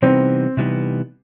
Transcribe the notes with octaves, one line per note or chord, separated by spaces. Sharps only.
C3 E3 G3 B3 C4 D#4
C3 E3 G3 B3 D#4